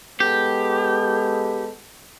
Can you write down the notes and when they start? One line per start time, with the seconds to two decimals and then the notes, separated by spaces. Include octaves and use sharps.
0.20 G#3 B3 G4 A4